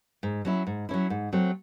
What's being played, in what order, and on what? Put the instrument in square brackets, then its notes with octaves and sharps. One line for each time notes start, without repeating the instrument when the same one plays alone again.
[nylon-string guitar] G#2
F#3 C#4 E4
G#2
F#3 C#4 E4
G#2
F#3 A3 C4